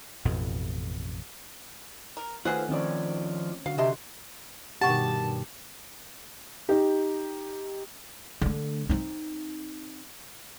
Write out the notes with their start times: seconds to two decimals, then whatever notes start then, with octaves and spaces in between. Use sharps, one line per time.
0.25 A1 F2 B2 E3
2.17 A#4
2.45 D#3 F#3 A3 F4 G#4 B4 C5 F#5
2.69 D#3 F3 C4 C#4 C#5 D5
3.66 D3 F#4 F5
3.78 C3 D#5 A5 C6
4.81 G2 B2 D#3 G4 F#5 A5 C#6
6.69 D#4 G4
8.41 D3 A3
8.89 C4 D#4